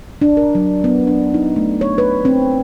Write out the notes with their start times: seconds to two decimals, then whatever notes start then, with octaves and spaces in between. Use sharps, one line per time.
0.21 D4
0.37 A#4
0.55 F#3
0.84 B3
1.07 D4
1.34 D#4
1.56 A3
1.81 C#5
1.98 B4
2.25 C4